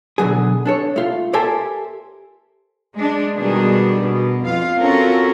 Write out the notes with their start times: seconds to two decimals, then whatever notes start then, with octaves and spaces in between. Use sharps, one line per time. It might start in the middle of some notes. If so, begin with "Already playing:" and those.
0.18 B2 D3 F#3 G#4
0.65 D4 A4 C#5
0.96 A3 F4
1.33 G4 A4 A#4 C5 E5 G#5
2.95 G#3 D4
3.36 B2 D#3 G3 B3 D4 G#4
4.00 B2 B3
4.44 F2 F4 F5
4.78 C4 C#4 F4 F#4 A4 A#4